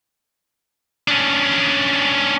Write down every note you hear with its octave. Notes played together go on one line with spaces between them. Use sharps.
C#4 D4